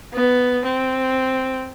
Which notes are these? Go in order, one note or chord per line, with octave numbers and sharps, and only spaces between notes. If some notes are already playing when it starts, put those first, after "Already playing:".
B3
C4